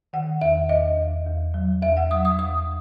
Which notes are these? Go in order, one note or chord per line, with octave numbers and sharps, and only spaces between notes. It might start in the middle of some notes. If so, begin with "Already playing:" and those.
D#3 F#5
E2 E5
E2 D#5
E2
E2
F#3
E2 E5
F#5
F#3 D#6
D#6
E2 D#6